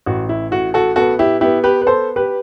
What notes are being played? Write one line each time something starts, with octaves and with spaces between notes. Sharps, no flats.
A1 F#4
E4
A2 F#4
F#4 A4
B3 F#4 A4
E4 G4
B3 E4 G4
G4 B4
B4
B3 A4 C5
G4 B4